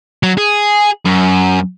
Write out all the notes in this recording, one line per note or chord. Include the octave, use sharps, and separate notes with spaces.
F#3
G#4
F#2